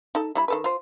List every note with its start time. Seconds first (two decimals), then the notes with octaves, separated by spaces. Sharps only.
0.15 D#4 A4
0.35 G3 E4 B5
0.48 D#3 A4 B4
0.64 F4 C5